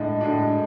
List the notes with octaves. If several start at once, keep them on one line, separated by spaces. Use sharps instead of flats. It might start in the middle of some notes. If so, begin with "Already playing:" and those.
Already playing: A2 G#3 D4
A2 G#3 D4